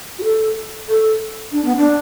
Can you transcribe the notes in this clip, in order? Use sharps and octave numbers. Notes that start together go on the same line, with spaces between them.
F#4
A4
A4
D4
B3
D4